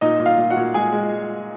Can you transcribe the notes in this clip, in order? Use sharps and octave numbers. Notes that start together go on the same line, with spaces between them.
A#2 D#4 D#5
A#2
F4 F5
A#2
F#4 F#5
A#2
G#3 G#4 G#5
G#3